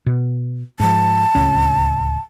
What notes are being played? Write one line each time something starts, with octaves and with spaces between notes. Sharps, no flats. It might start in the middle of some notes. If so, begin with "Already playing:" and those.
B2
G#2 F3 A5
D1 C#2 C#4